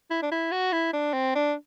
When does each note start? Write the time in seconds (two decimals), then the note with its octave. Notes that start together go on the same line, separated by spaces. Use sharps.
0.11 E4
0.23 D4
0.32 E4
0.52 F#4
0.73 E4
0.93 D4
1.14 C4
1.35 D4